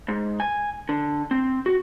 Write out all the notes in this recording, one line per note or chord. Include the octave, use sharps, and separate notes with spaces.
G#2
G#5
D3
C4
F#4